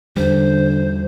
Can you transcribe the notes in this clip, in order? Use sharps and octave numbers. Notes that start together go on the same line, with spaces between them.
E2 D3 G3 C5